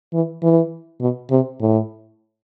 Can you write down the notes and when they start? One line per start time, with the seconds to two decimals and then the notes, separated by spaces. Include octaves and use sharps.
0.13 E3
0.43 E3
1.01 B2
1.31 C3
1.60 A2